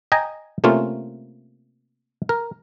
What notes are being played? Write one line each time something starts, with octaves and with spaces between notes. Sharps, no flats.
D#5 G5 G#5 A#5
C3 A3 A#3 C#4 F4
A#4